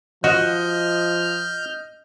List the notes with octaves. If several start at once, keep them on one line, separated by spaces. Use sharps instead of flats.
F3 F#4 D#5 F6 G6